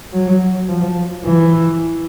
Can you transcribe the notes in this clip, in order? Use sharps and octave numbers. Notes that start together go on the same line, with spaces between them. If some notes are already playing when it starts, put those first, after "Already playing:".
F#3
F3
E3